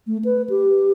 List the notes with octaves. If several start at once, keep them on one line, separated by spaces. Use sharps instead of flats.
A3
B4
G4